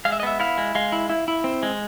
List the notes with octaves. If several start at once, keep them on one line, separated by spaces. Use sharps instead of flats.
G#3 F5
E5
D#5
B3 E5
E4 F5
G#3
G#3 F5
E4
E4
E4
C4
G#3